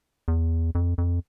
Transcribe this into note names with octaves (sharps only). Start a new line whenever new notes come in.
E2
F2
F2